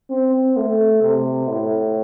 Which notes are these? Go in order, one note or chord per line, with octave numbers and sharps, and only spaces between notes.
C4
A3
C3
A2